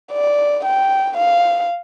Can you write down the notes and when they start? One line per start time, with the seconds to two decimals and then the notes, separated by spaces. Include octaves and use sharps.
0.12 D5
0.65 G5
1.17 F5